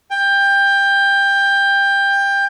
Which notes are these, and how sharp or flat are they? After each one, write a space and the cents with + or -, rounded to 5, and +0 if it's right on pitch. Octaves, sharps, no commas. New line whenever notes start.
G5 +20